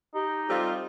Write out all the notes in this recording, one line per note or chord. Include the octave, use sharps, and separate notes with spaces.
D#4 G4
G3 C4 F4 A4